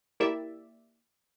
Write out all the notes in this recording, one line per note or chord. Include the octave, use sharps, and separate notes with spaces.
A#3 E4 G4 D5 E5